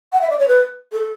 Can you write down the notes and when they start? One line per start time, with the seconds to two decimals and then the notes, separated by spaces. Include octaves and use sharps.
0.13 F#5
0.21 E5
0.30 D5
0.39 C#5
0.48 B4
0.93 A4